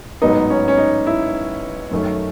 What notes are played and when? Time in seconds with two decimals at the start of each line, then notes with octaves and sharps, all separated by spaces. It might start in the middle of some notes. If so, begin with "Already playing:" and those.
0.22 A1 G#2 F#3 B3 D#4
0.50 C#4
0.68 C#4
0.77 D#4
1.06 E4
1.91 F#2 D#3 A3 C#4